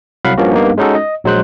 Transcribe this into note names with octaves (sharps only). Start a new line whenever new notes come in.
C2 F#3 F5 F#5 B5
G2 F3 A#3 C#4 F#4
G2 A#3 B3 D#4
G#3 C#4 D#4 F#4 A4
D#5
A#1 F#3 G#3 C5 F#6